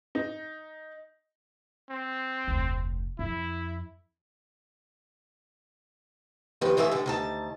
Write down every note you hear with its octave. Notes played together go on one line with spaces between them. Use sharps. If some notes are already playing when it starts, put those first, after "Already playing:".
D#4
C4
F1 D2
F2 E4
D#2 F3 G4 B4
G#2 E3 A3 G#4 C5 E5
A2 D3
D2 D#3 A5